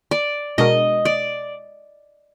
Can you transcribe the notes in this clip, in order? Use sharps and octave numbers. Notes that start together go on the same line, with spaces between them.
D5
B2 G#3 D4 F#4 A#4 D#5
D5